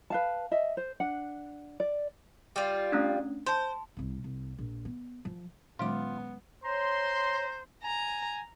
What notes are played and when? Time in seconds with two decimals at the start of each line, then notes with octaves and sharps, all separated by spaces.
0.10 B4 F5 A5
0.51 D#5 E5
0.77 C5
1.00 D4 F#5
1.80 D5
2.56 G3 F4
2.92 A3 C#4 D4
3.47 C5 A5 C6
3.97 C2 C3
4.24 C2
4.58 A#1
4.85 B3
5.25 F3
5.79 A#2 D#3 F#3 G#3 B3 C#4 F4 D6
6.64 C5 C#5 A#5 C6
7.84 G#5 A#5